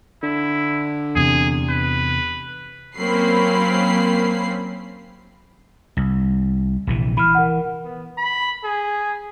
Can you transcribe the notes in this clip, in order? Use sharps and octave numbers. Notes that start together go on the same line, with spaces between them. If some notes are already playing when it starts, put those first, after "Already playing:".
D3 E4
E2 C3 G#4
B4
F#3 A#3 C4 C#4 B5 C7
C2
A#1 C3 E3
E3 B5 F6
A#4 F#5
B3
B5
G#4